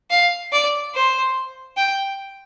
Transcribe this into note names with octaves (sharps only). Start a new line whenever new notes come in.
F5
D5
C5
G5